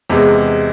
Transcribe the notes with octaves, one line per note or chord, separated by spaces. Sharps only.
E2 C3 G#3